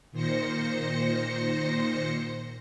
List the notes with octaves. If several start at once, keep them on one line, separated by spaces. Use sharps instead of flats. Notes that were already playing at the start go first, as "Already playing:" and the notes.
A#2 D#3 C5 A#6 C#7